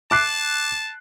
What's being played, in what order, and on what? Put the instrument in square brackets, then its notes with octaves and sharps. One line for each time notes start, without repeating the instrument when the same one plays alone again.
[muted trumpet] A5 [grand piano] D6 F#6 C7